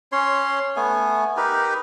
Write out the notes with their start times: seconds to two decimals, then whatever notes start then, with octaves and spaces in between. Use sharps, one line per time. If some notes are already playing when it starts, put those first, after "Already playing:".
0.12 C#4 C#5 C6
0.76 A3 B3 G#5
1.37 D#4 G4 A#4 B4